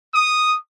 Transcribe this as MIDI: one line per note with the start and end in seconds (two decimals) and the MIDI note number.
0.14 0.56 87